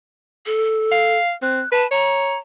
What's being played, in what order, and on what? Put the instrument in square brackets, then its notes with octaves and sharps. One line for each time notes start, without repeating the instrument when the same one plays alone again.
[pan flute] A4
[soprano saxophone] F5
[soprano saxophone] C4 [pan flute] F#6
[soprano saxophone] B4 [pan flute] A5
[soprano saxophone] C#5 [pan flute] A#5